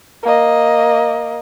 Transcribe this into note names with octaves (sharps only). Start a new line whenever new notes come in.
A#3 D#5